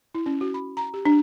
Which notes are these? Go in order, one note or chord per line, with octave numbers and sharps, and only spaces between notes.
E4
C#4
F#4
B5
A#5
G4
D4